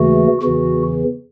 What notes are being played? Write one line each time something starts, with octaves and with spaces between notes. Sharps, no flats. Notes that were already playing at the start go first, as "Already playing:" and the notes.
Already playing: D#2 C#3 E3 A3 F#4
E2 C#3 E3 F#4